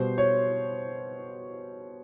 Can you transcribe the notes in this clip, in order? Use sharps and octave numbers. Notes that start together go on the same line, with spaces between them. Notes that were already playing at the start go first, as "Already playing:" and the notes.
Already playing: B2 G3 C5
C#5